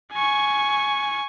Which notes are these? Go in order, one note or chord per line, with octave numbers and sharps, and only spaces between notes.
G#5 C#6